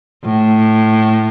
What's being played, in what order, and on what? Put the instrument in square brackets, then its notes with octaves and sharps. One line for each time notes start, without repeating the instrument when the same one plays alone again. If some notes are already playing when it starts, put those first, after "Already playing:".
[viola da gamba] A2